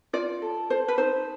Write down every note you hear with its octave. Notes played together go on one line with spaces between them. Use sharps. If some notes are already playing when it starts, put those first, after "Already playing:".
F4 D5
A4
A4 C5
B4
D#4 C5